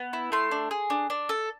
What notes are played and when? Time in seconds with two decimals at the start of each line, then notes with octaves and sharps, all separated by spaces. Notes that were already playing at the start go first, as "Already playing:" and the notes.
Already playing: B3
0.13 E4
0.32 A3 C6
0.51 D4
0.71 G#4
0.90 D4
1.10 D4
1.29 A4